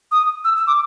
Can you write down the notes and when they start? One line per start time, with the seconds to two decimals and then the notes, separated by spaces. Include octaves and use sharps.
0.12 D#6
0.44 E6
0.56 E6
0.67 D6